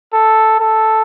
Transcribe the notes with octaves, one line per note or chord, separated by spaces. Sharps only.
A4
A4